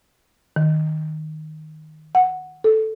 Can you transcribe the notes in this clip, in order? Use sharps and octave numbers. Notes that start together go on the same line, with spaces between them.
D#3
F#5
A4